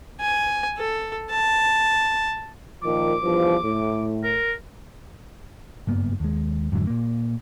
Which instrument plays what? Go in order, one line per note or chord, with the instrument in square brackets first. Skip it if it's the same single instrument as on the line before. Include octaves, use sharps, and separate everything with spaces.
[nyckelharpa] G#5
A4
A5
[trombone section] A#2 D#3 F3 [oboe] D6
[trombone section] E2 G2 F3
A2
[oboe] A#4
[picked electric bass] F#1 G2 A#3 B3
D#2 G#3
F2 G#2 D3 F#3
A#2 A#3